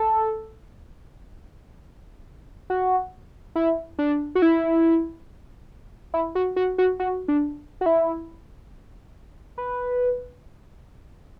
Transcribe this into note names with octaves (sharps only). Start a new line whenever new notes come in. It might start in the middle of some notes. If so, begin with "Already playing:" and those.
Already playing: A4
F#4
E4
D4
F#4
E4
E4
F#4
F#4
F#4
F#4
D4
F#4
E4
B4